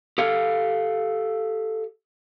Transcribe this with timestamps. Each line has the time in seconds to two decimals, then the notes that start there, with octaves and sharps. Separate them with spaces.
0.18 G4 A4 F5